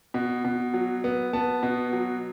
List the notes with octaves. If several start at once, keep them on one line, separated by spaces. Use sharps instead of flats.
B2
B2
F#3
B3
B3 A5
B2
F#3